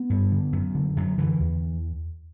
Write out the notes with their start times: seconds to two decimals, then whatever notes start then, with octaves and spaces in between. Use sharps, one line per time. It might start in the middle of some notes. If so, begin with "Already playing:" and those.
Already playing: B3
0.10 G2
0.32 D3
0.52 F#2
0.75 D3
0.96 F#2 F#3
1.18 D3 E3
1.39 E2